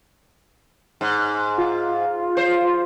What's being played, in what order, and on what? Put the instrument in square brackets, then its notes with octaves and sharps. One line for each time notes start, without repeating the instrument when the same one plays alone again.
[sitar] G#2
[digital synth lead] F4
[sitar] C5